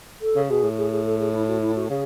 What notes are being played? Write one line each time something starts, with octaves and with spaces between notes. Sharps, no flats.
A4
C#3
B2 G#4
A2
G#4
G#4
A4
G#4
E4
F#4
E4
F#4
C#3 G#4